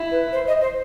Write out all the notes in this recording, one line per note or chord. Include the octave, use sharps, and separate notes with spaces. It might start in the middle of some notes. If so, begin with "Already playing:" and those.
Already playing: E4
B4
C5
D#5
C5